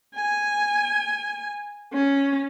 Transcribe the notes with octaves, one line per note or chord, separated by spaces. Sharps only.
G#5
C#4